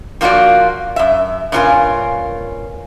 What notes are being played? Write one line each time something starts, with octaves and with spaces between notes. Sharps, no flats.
F3 A#3 F4 F#4 D5
F#2 E5
G2 A#2 C#4 F4 A#4 G#5